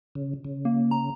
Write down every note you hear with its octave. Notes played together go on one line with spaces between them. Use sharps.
C#3
C#3
A#3
A#5